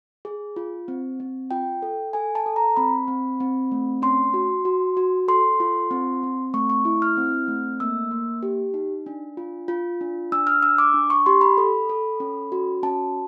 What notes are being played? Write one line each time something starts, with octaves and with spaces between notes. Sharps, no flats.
G#4
F4
C4
C4
F4 G5
A4
A4 G#5
A5
A4
A#5
C4 B5
C4
C4
A3
C#4 C6
F#4
F#4
F#4
A4 C6
F4
C4
C4
A3 C#6
C#6
E4
F6
C4
A3
A#3 E6
A#3
G4
D#4
D4
F4
F4
D4
D4 E6
F6
D4 E6
D6
D4
C#6
G4 C6
B5
A4
A4
C#4
F#4
C#4 A5